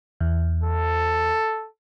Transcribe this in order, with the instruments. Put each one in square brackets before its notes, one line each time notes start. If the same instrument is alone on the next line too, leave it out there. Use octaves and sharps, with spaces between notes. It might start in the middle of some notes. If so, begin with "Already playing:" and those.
[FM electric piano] E2
[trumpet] A4